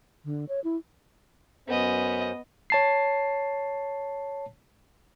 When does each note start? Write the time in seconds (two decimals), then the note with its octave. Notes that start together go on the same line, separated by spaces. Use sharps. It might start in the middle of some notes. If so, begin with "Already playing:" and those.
0.25 D3
0.49 C#5
0.64 E4
1.68 F#2 B3 C#4 C5 D#5
2.70 C#5 A5 C7